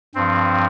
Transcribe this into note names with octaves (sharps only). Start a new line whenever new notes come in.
G2 F3 C4